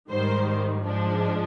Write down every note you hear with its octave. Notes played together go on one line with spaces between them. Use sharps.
G#2 D#3 G3 C5
G#2 F3 G#3 D4